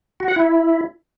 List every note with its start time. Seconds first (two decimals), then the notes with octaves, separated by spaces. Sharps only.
0.20 F#4
0.28 F#5
0.36 E4